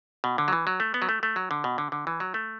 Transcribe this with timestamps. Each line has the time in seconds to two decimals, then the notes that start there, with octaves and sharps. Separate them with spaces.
0.24 B2
0.38 D3
0.48 F#3
0.53 E3
0.67 F#3
0.80 A3
0.94 B3
1.02 F#3
1.09 A3
1.23 A3
1.36 F#3
1.51 D3
1.64 B2
1.78 D3
1.92 D3
2.07 E3
2.20 F#3
2.34 A3